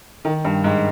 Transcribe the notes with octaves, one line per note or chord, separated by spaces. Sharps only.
D#3
G2
G#2